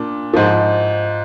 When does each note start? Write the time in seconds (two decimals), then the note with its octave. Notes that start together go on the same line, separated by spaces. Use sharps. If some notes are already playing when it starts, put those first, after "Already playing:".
Already playing: A#2 D4
0.34 G#2 F3